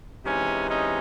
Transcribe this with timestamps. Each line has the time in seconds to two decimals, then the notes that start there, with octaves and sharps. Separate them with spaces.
0.25 C3 E3 G#3 C#4 D#4
0.70 C#4 D#4